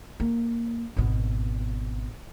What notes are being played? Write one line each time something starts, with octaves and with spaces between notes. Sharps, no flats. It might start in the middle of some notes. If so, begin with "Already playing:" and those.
A#3
G#1 B2